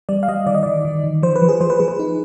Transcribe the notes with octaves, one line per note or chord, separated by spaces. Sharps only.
G3 D5
F5
G3 D#5
D#3 D5
D#5
D#3 D5
D#3
D#3
F3 C5
B4
F3
G#4
F3 C5
B4
F3 G#4
B4
D#4